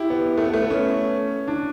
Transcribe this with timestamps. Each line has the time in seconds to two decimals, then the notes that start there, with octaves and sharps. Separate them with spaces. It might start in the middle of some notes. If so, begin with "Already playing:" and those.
Already playing: E4 G4
0.10 B3
0.37 A3
0.45 B3
0.54 A3
0.62 B3
0.70 C#4
1.48 D4